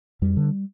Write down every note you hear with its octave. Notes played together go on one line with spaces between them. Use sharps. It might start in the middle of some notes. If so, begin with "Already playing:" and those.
F2 G3
D3